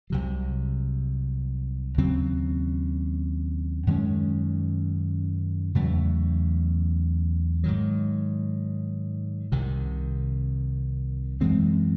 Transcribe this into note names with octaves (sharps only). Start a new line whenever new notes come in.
C2 C3 F#3
D#2 C#3 F#3 C4
F#2 D#3 G#3 C#4
E2 C#3 F#3 A3
G#2 D#3 F#3
C2 C3 D#3
F#2 E3 G#3 C4